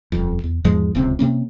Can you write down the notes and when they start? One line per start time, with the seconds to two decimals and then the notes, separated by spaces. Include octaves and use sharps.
0.12 D#1 F2
0.44 E2
0.64 E2 G#2 F3 G#3
0.95 D1 C#2 C3 C4
1.19 C3 A#3 C#4